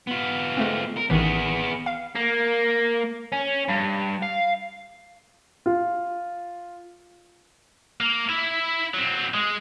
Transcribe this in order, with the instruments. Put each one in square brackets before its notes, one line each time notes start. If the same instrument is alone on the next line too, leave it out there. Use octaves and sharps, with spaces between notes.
[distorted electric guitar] B3 F4
[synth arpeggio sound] G#3 A3 C4
[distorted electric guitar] A#4
[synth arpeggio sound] A1 D#3 E3 [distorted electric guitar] B3 G#4
[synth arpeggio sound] F5
[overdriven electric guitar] A#3
C#4
G2
F5
[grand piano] F4
[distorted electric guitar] A#3
E4 E5
F#3 C4
G#3